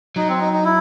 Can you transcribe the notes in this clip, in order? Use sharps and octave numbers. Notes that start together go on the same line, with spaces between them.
F#3 D#4
C4
D#4
D#4
E4